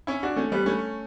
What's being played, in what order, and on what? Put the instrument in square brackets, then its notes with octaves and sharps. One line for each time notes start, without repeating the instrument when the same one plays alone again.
[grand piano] C#4 E4
D4 F#4
A3 C#4
G3 B3
A3 C#4